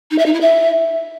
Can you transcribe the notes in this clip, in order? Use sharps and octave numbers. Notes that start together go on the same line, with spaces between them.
D#4
E5
D#4
E4
E5